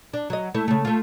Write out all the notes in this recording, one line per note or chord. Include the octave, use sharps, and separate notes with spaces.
D4
F#3 D#5
A3 E4
C#3 A3
A3 F4